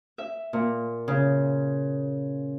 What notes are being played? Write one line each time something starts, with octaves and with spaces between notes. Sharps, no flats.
E5
A#2
C#3